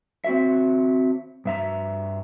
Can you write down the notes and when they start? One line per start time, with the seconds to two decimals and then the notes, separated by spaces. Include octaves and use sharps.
0.24 C4 F#4 E5
1.45 G2 E5 A#5